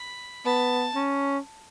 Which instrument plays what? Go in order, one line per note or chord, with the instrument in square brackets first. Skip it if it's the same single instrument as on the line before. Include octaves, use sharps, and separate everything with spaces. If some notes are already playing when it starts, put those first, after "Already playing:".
Already playing: [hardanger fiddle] B5
[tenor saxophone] B3 [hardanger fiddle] A5
[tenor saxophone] C#4